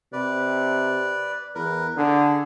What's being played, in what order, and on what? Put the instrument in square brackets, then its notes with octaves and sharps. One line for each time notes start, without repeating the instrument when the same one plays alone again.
[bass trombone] C3 [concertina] B4 D5
[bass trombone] E2 [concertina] A#4 B4
[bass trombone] D3 [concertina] G#4